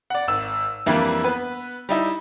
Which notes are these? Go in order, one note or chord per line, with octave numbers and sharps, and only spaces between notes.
D5 F#5
G#1 E6
F2 E3 G3 A#3 D4 E4
B3 B4
G3 D#4 E4